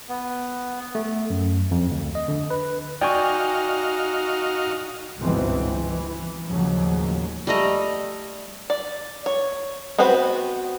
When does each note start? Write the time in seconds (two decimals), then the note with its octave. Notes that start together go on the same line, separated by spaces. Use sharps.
0.09 B3
0.95 A3
1.30 F#2
1.71 F2
1.91 D2
2.15 D#5
2.28 D3
2.50 B4
3.01 D#4 F#4 D5 F5 G5 G#5 C#6 G6
5.19 G1 C#2 G#2 B2 E3 C4
5.89 E3
6.47 D#2 A2 C#3 F3 F#3
7.47 G3 A3 D#5 A#5
8.70 D5
9.26 C#5
9.98 B3 C4 F#4 B4 C5